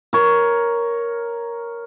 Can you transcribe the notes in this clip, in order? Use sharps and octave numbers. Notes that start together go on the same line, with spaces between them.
A#4 C#5